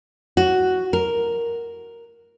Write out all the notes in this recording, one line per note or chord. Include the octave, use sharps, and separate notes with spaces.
F#4
A#4